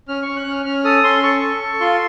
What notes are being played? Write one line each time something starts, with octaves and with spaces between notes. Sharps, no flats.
C#4 F6
C#6
C#4
F#6
C#4 F6
C#4 F6
A4 D#6
C#4 C6
A4 C#6
A4
A4
F4 C6